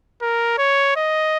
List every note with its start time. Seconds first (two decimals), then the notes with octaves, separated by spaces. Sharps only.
0.22 A#4
0.58 C#5
0.96 D#5